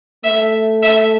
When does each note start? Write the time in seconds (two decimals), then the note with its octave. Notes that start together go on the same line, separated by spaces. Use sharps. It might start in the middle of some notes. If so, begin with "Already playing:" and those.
0.24 A3 E5
0.83 E5